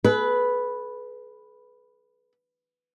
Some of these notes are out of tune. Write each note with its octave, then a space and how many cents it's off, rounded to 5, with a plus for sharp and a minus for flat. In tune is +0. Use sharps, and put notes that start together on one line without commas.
G#4 +45 B4 +0